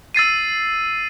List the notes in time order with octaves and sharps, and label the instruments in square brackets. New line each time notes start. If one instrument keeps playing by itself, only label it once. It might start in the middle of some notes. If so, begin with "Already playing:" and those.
[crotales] E6 A6 C7 D#7